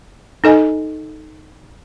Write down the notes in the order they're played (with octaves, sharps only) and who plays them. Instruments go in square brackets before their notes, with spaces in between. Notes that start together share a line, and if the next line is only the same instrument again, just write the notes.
[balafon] D#4 A4 D#5 G#5